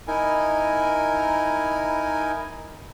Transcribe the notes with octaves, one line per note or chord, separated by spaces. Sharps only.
D#4 E4 A#4 G#5